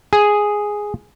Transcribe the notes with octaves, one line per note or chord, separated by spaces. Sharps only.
G#4